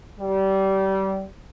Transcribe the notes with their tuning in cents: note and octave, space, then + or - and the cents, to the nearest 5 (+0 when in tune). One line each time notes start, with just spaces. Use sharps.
G3 -25